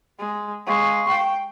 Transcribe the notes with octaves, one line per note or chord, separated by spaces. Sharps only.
G#3
G#3 F5 C#6
G5